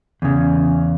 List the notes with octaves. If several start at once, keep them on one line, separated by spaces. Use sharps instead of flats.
E2 C#3